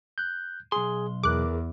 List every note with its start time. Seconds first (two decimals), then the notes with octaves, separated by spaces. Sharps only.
0.18 F#6 G6
0.72 B1 G#4 C6
1.24 E2 G#4 A#4 D6 F#6